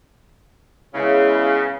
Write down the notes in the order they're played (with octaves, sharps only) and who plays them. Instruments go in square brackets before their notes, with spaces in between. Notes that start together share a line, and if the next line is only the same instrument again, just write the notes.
[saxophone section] C#3 [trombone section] G#3 B3 E4